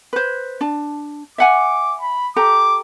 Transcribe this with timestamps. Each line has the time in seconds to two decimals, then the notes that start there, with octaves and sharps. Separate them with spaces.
0.13 B4 C5
0.61 D4 A5
1.38 E5 F#5 G#5 D6
2.01 B5
2.36 G4 A4 A#5 D6